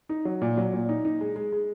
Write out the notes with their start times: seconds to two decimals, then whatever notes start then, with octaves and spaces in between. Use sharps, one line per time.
0.09 D#4
0.25 F#3
0.41 A#2
0.57 F#3
0.73 A#2
0.89 D#4
1.05 D#4
1.21 G#3
1.36 G#3
1.52 G#3